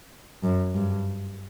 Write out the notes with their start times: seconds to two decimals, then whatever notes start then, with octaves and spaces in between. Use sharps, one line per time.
0.43 F#2
0.74 G2